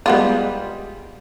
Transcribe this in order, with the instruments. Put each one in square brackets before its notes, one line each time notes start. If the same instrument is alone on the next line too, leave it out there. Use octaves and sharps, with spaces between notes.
[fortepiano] G3 G#4 [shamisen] G#3 B3 F4